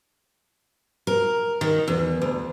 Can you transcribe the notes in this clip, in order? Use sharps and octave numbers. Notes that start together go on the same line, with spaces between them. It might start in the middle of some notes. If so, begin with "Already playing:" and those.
A#4
D#3
E2
D2